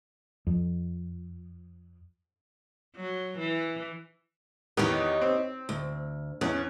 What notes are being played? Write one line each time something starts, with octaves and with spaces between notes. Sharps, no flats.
F2
F#3
E3
E2 D#3 B3 D#4 G4 C#5
C4
D2
E2 C#4